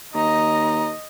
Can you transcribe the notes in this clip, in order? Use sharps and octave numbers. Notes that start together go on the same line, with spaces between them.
D#2 D#5 A#5